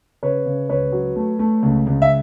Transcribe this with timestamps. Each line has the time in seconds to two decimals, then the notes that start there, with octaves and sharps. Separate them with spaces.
0.23 C#3 B4 C#5
0.46 C#3
0.69 C#2 B4 C#5
0.92 F#3
1.16 A3
1.39 A3
1.63 C#2
1.87 C#2
2.02 E5